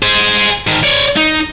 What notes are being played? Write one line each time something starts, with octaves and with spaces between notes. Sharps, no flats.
G#4 C5
G#2 D#3
C#5 D5
D#4